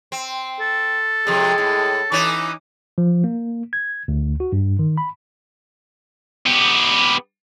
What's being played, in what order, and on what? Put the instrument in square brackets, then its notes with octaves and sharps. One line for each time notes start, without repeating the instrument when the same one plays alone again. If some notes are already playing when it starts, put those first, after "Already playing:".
[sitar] C4
[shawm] A4
[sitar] F2 C3 [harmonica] G#3
[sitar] A2
[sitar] E3 C#4 [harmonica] D#4 D6
[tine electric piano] F3
A#3
G#6
D2
F#4
G2
D#3
B5
[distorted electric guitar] B3 G4